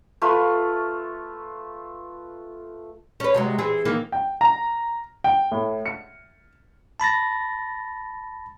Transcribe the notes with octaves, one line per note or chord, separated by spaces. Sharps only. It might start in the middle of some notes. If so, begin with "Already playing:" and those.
A3 F4 B4
C#4 B4
C3 F#3 G#3
E3 C4 G#4
D#3 E3 A#3
G5
A#5
G5
A2
C#7
A5 B5 A6 A#6